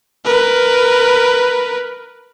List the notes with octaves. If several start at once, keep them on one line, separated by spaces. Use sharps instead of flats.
A#4 B4